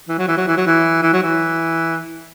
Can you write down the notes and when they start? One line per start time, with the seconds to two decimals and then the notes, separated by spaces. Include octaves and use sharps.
0.08 E3
0.18 F#3
0.28 E3
0.37 F#3
0.48 E3
0.57 F#3
0.67 E3
1.02 E3
1.13 F#3
1.23 E3